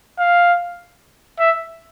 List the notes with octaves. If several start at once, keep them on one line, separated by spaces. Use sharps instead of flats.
F5
E5